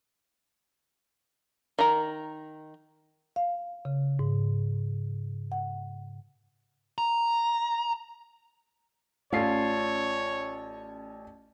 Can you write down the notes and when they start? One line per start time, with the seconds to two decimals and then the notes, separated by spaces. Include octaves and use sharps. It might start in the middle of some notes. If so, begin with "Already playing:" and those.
1.79 D#3 A#5
3.36 F5
3.85 C#3
4.19 G#2
5.52 F#5
6.98 A#5
9.33 A1 C#4 F4 C#5 D5 A5 A6 C7